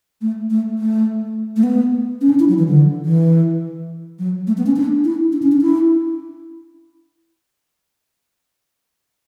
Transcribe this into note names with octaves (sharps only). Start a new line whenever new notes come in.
A3
A3
A3
A3
B3
C#4
D4
E4
F#3
E3
D3
E3
F#3
A3
B3
C#4
D4
E4
D4
C#4
D4
E4